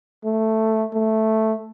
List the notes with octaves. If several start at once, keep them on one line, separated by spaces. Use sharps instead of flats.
A3
A3